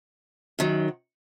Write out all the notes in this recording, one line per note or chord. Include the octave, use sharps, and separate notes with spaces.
F#2 D#3 F#3